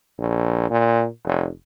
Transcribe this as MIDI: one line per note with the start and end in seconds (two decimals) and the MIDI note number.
0.19 0.70 34
0.70 1.06 46
1.25 1.48 29